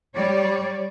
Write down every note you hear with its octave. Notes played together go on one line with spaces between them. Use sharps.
G3 C#5 D5